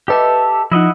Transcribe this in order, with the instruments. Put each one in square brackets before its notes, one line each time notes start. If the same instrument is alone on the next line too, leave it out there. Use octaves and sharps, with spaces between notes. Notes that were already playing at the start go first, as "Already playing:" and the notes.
[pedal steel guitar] G4 A4 E5 [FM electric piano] B4 D#5 D6
[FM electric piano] F3 D#4 [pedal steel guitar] E4 D#5 F#5